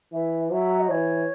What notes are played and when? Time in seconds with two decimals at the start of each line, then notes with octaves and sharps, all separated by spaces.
0.13 E3 E5
0.51 F#3 E5
0.79 D#5
0.89 E3 C#5